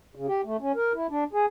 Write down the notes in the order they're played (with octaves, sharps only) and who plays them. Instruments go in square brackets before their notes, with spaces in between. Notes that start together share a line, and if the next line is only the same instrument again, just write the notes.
[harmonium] C#3
G4
A3
C#4
A#4
E4
D4
G#4